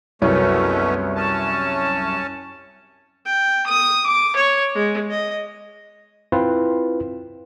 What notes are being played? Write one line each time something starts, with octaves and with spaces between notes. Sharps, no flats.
C2 F#2 B2 A3 C#4 C#5
C#4 A5
G5
D#6
D6
C#5
G#3
D#5
C4 E4 F4 B4